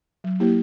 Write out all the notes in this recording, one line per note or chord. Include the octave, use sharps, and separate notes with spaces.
F#3
A#3 E4 G4